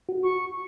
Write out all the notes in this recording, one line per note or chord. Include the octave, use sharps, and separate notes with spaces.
F#4
C#6